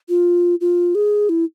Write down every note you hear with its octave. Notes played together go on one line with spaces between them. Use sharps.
F4
F4
G#4
E4